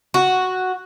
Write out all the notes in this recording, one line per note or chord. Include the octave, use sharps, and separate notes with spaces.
F#4